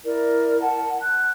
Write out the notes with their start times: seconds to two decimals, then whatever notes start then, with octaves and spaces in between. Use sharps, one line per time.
0.04 E4 A#4 D5
0.60 F#5 A5
1.02 F#6